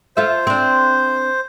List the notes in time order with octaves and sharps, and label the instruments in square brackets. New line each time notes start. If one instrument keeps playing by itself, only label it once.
[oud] F4 A4 E5 [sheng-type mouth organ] C5
[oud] C4 D4